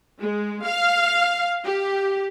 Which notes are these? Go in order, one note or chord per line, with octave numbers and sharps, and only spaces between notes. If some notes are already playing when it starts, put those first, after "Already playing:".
G#3
F5
G4